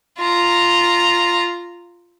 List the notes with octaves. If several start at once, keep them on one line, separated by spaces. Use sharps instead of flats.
F4 A#5